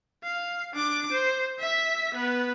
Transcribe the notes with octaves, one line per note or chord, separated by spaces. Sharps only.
F5
D4 D6
C5
E5 B6
B3 B4